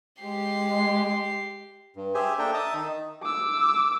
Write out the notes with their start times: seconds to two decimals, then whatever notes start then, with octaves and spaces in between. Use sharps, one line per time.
0.21 G#3 G4 C7
1.96 G2
2.15 G4 G#4 C5 E5 G#5
2.39 A#3 D4 A4 E5 G5 A#5
2.54 D#5 E5 A5 A#5 D#6
2.74 D#3 D#4
3.23 D6 E6